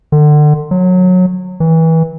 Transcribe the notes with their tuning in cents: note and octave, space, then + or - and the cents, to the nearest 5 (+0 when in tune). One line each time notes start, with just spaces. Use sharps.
D3 +30
F#3 -20
E3 -25